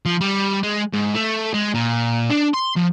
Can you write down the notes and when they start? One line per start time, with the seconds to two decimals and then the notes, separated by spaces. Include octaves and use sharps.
0.06 F3
0.21 G3
0.63 G#3
0.94 G#2
1.14 A3
1.54 G#3
1.74 A#2
2.30 D4
2.54 C6
2.76 F3